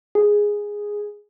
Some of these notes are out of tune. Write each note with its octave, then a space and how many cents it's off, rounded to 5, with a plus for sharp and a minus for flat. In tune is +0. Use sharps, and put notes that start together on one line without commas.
G#4 -5